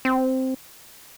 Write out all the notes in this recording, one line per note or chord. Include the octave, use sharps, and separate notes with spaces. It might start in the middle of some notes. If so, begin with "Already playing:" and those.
C4